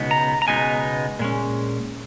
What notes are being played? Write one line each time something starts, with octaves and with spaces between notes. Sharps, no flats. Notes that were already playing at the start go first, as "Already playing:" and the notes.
Already playing: C#2 B2 G#3 B3 D#4
A#5
A#5
C#2 B2 G#3 B3 D#4 G#5
A#2 G#3 C#4